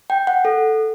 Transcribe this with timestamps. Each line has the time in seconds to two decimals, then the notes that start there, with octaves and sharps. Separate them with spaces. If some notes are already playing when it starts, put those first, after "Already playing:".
0.10 G5
0.27 F#5
0.45 A4